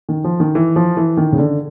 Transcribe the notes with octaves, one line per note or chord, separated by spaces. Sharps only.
D#3
F3
D#3
E3
F3
E3
D#3
C#3
D3